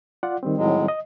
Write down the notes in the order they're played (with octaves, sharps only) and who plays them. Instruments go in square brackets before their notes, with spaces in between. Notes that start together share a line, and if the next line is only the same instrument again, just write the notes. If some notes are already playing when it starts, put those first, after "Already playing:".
[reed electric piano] F4 D5 F#5
D#3 G3 C4
[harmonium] A2 F#3 G#3
[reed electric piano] D#5